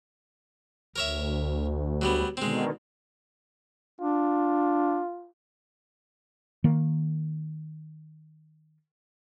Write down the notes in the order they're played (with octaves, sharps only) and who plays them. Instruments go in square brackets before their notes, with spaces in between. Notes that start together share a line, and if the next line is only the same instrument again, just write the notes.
[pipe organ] D2 [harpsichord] A#4 C#5 E5
[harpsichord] F#3 G3 B3
[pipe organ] B2 D3 D#3 [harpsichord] G#3 C4
[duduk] D4 [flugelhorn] F4
[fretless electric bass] D#3 A#3